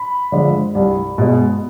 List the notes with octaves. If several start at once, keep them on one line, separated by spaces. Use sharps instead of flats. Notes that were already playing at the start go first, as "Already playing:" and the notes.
Already playing: B5
D3 F3 G#3
C2
B2 G#3